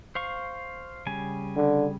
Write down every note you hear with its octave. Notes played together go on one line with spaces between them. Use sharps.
C5 F5 C#6
C#3 G3 G#5
D3